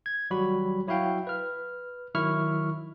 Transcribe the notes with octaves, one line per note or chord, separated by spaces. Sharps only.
G#6
G#1 F#3 G3 F#4 B5
F#3 E4 F#4 F5 G5
B4 F6
D#3 F#3 E4 C#6 F6